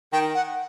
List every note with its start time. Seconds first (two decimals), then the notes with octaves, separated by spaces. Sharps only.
0.13 D#3 G5
0.35 F#5